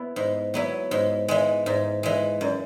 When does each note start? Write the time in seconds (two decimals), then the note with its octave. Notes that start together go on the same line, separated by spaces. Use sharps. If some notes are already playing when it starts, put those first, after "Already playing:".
Already playing: B3 E4
0.16 G#2
0.54 F#3 B3 E4
0.91 G#2
1.28 E3 G#3
1.66 G#2
2.03 E3 G#3
2.41 F#2